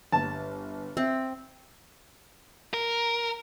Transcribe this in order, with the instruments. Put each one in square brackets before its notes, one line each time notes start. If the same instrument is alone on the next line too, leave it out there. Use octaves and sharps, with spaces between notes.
[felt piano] G1 [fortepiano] A5
[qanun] C4 [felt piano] E5
[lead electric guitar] A#4